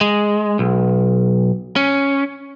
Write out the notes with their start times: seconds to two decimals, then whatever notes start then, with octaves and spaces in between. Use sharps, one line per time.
0.01 G#3
0.59 B1
1.76 C#4